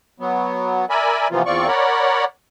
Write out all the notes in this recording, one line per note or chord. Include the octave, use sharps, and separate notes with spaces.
F#3 B3
A#4 D5 E5 G#5 B5
C3 E3 F3 A#3 B3 F4
E2 C4 F4 D5 C#6
A#4 C#5 D5 F#5 B5